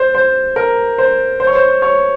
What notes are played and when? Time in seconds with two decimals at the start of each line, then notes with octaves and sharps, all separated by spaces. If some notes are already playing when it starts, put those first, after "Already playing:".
Already playing: C5
0.15 C5
0.56 A#4
0.98 C5
1.40 C5
1.47 C#5
1.55 C5
1.82 C#5